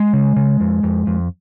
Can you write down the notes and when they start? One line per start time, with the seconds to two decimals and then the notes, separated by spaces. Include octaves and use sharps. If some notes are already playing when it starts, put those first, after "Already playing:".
Already playing: G#3
0.13 C#3
0.36 C#3
0.60 F2
0.83 F2
1.07 F2